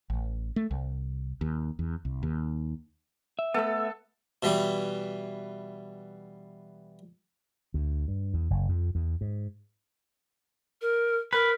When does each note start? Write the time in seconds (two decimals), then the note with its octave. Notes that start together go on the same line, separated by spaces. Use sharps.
0.10 A1
0.56 A3
0.71 C2
1.41 D#2
1.79 E2
2.05 C2
2.23 D#2
3.39 E5
3.54 A3 B3 A4 E6
4.43 B2 E3 G3
7.74 D2
8.08 G2
8.34 E2
8.50 F#1
8.69 F2
8.95 E2
9.21 G#2
10.81 A#4
11.33 A#4 B4